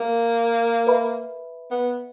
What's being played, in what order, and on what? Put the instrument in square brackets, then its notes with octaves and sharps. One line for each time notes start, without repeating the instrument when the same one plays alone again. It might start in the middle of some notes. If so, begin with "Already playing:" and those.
Already playing: [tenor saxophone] A#3
[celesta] B4 E5 B5
[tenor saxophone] B3